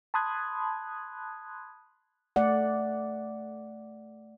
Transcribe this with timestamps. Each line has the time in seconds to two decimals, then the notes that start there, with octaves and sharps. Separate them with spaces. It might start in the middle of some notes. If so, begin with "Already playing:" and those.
0.14 A5 B5 C6 D#6 F#6 G#6
2.36 A3 D5 F#5